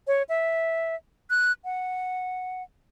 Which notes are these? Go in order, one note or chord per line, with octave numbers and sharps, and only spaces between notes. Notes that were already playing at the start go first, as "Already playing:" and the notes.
C#5
E5
F#6
F#5